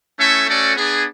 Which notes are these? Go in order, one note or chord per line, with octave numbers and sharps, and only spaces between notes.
A3 C#4 E4 A4 E5
A3 C#4 F#4 A4 D5
B3 D4 G#4